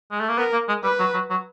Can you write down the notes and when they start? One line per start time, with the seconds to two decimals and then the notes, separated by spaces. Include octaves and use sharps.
0.11 G#3
0.20 A3
0.29 A#3
0.38 B3 A#4
0.53 A#3
0.68 G#3
0.84 G3 B4
0.99 F#3
1.14 F#3
1.30 F#3